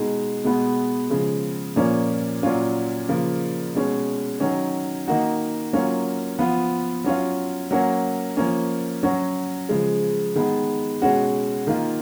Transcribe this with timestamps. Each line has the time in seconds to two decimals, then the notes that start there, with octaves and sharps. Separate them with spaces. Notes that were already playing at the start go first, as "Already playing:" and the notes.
Already playing: B2 G#3 D#4
0.44 B2 G#3 B3
1.10 C#3 F3 G#3
1.76 A#2 F3 A#3 C#4
2.43 A#2 F#3 C#4 F4
3.08 C#3 F3 A#3 F4
3.75 B2 G#3 C#4
4.40 D#3 F#3 C#4
5.07 D#3 A#3 D#4 F#4
5.73 F#3 A#3 C#4 F4
6.39 F3 B3 F4
7.04 F#3 C#4 F4
7.71 F#3 A#3 C#4 F#4
8.37 F3 A#3 C#4
9.03 F#3 C#4 F#4
9.69 C#3 F3 G#3
10.36 D#3 G#3 B3
11.02 B2 G#3 C#4 F#4
11.67 D#3 A#3 F4